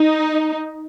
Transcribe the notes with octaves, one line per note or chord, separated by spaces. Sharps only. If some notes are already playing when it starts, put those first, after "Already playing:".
Already playing: D#4